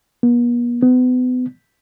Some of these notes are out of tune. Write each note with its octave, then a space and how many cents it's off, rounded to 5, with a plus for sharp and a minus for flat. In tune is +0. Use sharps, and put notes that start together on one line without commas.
B3 -45
B3 +35